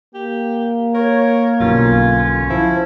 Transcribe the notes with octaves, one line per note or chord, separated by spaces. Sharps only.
A#3 G4
A#4 C#5
B1 G2 D3 C#4 F4
F3 E4